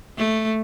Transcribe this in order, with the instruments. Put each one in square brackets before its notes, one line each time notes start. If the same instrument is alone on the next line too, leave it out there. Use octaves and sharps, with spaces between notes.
[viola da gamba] A3